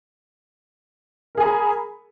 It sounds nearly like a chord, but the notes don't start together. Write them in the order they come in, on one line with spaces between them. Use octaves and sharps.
A#4 G#4 G#5 A#5 B5